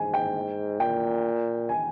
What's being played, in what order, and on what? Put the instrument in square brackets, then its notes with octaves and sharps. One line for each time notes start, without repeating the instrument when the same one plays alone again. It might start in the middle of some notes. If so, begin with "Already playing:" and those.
Already playing: [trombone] G#2 [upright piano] G#5
[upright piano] G5
[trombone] A#2 [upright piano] G5
[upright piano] G#5